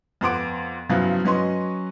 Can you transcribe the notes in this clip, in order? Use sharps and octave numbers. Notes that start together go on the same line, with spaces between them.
F2 B3 F#5 C6 D6 D7
C#3 F3 F#3 B3 E4 F4
F#3 C#4 B4 D#5 C6 C#6